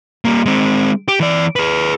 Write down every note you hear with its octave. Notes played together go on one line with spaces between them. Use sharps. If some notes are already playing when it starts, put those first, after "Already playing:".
G3 A#3
G#3 C4
G4
E3 D5
G#4 B4